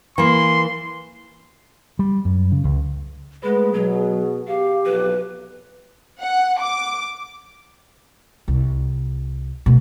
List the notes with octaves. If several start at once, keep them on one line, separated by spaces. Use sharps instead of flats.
E3 A#3 C6
G3
F#2
C#3
C#2
G#3 A3 B3 G#4 B4
B2 F#3
G4 F5
B1 F2 B4
F#5
D6
C2
B2 A3